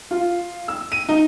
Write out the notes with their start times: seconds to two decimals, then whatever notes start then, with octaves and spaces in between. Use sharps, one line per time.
0.11 F4
0.68 E6
0.92 D#7
1.09 D#4